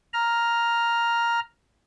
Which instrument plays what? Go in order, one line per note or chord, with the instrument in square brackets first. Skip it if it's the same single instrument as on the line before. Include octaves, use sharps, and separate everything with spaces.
[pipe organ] A#5 F6